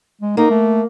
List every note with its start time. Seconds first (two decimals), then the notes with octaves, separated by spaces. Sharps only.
0.21 G#3
0.37 A#3 D#4
0.50 A3